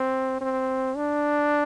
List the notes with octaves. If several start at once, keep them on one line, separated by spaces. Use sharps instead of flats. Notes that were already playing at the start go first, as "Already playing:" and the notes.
Already playing: C4
C4
D4